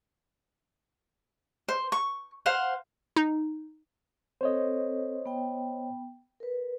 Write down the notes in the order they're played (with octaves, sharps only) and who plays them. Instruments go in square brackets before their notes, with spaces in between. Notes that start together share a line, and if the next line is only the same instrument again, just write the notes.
[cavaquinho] C5
C#6
C5 F5 F#5
[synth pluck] D#4
[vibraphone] C4 A4 [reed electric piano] C5 C#5 D#5
[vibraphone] B3 G5
A#4 B4